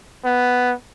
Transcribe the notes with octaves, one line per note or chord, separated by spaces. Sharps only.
B3